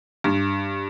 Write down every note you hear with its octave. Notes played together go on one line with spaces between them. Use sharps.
G2